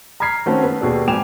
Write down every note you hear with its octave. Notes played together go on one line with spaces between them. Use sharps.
A#5 B5 F6 G#6 B6 C7
D#3 A3 C4 C#4 F#4 A4
B3
D#2 B2 G#4 A4 D5
G#1 G5 G#5 D6 E7 F7